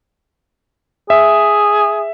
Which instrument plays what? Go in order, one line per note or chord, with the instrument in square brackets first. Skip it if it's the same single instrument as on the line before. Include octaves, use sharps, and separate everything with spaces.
[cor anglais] G#4 [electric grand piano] E5